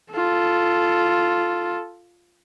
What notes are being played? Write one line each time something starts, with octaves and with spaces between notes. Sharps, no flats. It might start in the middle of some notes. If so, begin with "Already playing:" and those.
F4 A4